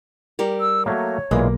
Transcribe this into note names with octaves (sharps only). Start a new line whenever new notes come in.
G3 G4 A#4
E6
F#3 A3 A#3 C#5
B1 A#2 E3 G#3 A#3